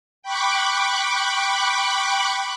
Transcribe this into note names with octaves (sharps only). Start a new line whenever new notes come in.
G5 B5 C#6 D6 F#6